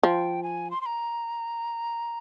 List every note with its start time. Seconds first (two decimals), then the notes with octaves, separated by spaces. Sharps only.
0.03 F3 G5
0.43 G#5
0.71 C6
0.81 C6
0.86 A#5